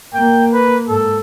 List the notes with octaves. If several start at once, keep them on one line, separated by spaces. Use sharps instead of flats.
A#3 G5
B4
G#2 A4